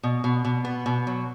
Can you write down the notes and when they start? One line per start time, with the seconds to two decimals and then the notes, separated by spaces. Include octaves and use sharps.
0.03 B2
0.24 B2
0.45 B2
0.65 B3
0.86 B2
1.07 F#3